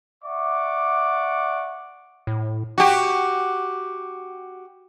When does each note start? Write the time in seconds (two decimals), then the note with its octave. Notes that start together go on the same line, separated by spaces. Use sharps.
0.23 D5 E5 F#5 C#6 D6
2.27 A2
2.78 F#4 G4